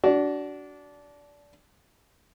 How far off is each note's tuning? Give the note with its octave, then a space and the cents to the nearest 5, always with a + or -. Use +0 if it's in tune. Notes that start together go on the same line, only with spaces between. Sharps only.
D4 -20 F#4 +20